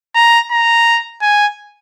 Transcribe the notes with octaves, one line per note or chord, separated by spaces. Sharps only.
A#5
A#5
G#5